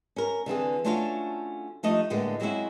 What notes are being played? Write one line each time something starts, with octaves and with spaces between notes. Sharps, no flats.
C#4 A#4
D3 E3 C4 G#4
A3 C#4 D4 F4 F#4 F5
F3 G3 A3 D4 D#4 D#5
A2 D3 G#3 A#3 B3
F#3 G#3 C4 C#4 E4 F#4